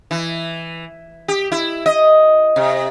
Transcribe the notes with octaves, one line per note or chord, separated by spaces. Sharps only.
E3
G4
E4
D#5
C3